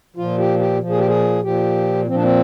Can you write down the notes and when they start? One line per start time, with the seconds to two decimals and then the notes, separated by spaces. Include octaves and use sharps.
0.16 A#2 F3 F4
0.38 G4
0.59 G4
0.80 A#2 F3
0.90 G#4
0.98 G4
1.08 G#4
1.43 A#2 F3 G4
2.07 F3 C4
2.11 A#2 D4
2.23 C4